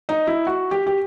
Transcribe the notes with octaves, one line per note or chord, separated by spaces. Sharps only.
D#4
E4
F#4
G4
G4